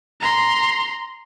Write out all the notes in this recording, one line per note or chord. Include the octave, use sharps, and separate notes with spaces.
A#5 C6